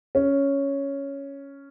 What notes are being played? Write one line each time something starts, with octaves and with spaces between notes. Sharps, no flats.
C#4